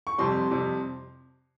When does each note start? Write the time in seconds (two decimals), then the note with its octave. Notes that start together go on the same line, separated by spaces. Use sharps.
0.07 C#6
0.18 F2 C3 G3 C6
0.51 F2 C3 G3